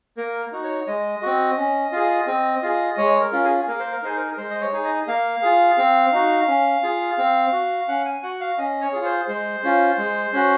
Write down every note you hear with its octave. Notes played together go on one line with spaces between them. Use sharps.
A#3 A#4
D#4 F#4
C#5
G#3 D#5
C4 F#4
C#4
F4 G#4
C4
F4 G#4
G#3 C#5
A#4
C#4 F4
G#4
A#3 A#4
C5
A#4
D#4 G#4 C5
A#4
A#4
G#3 C5
D#5
C#5
D#4 G#4
D#5
A#3 F5
F4 G#4
C4
D#4 F#4
C#4
F4 G#4
C4
F#4
C#4 F#5
G#5
F#4 F#5
F5
C#4 D#5
C#5
F4 G#4
C5
G#3 C5
C#4 F4
G#3
C#4 F#4